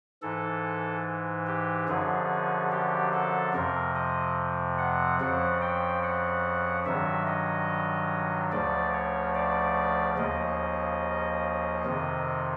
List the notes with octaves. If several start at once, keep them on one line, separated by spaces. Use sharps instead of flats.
G#2 E3 A4
G4
F#2 D3 F3 G#4
G4
A4
F2 C3 F3 A#4
D#5
F#5
F2 C#3 F3 F#5
G5
F#5
G2 D#3 F#3 E5
D#5
D2 C#3 F3 D5
C#5
D5
D#2 C#3 F3 D#5
F2 C3 D#3